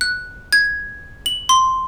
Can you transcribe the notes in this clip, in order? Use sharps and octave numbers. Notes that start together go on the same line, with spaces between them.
F#6
G#6
F#7
C6